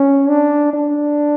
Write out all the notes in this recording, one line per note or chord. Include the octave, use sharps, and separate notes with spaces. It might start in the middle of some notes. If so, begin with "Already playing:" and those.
Already playing: C#4
D4
D4